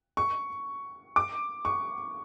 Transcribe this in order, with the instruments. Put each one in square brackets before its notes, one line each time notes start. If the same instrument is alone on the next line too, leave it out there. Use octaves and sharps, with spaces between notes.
[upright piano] C#6
D6
C#6